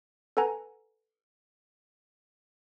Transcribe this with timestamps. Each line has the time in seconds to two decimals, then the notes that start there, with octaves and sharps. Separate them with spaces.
0.37 A4 B4 F#5 G#5 A#5